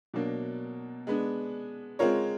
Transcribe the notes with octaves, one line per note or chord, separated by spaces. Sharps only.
B2 F#3 A#3 D4
G#3 B3 D4
G#3 C4 F4 A#4 C#5